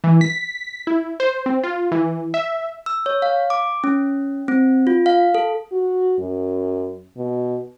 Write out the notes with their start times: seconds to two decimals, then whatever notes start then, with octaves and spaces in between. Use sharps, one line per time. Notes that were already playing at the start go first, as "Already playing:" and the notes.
0.04 E3
0.21 B6
0.87 E4
1.20 C5
1.46 C4
1.63 F4
1.92 E3
2.34 E5
2.86 E6
3.06 C#5
3.22 F5
3.50 D6
3.84 C#4
4.48 C4
4.87 F4
5.06 F5
5.35 A4
5.72 F#4
6.19 F#2
7.17 B2